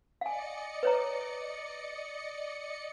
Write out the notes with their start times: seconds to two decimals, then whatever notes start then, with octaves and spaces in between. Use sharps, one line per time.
0.21 D5 D#5 F5 G#5 C#7
0.83 B4 C#5 A#5